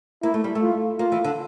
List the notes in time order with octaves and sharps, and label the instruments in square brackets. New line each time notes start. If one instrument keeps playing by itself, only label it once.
[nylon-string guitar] A#3 [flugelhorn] E4
[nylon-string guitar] A3
G3
A3
[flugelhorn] F4
[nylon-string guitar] A#3 [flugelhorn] F4
[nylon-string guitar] E3
D3